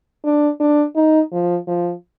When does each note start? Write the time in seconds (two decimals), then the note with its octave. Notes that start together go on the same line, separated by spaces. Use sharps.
0.24 D4
0.60 D4
0.96 D#4
1.32 F3
1.67 F3